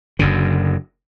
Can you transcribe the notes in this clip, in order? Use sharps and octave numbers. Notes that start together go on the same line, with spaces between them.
F#1 F#2 D3